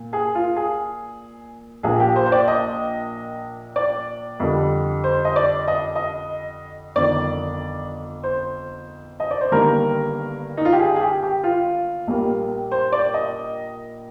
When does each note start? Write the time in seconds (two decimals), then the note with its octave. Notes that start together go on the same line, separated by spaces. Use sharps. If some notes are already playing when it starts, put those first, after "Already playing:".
Already playing: A#2
0.13 G#4
0.35 F4
0.56 G#4
1.83 A#1 A#2 F3 A#3 G#4
2.00 G4
2.16 C5
2.26 C5
2.32 D5
2.48 D#5
3.76 D5
4.40 F2 D3 G3
5.04 C5
5.25 D#5
5.36 D5
5.68 D#5
5.95 D#5
6.96 G1 F2 D#3 D5
8.23 C5
9.20 D#5
9.31 D5
9.41 C5
9.52 G1 G2 D#3 G3 A#3 A#4
10.57 D#4
10.65 F4
10.72 G4
10.79 G#4
10.96 G#4
11.01 G4
11.23 G4
11.43 F4
12.07 A#1 A#2 G3 A#3
12.71 C5
12.92 D5
13.14 D#5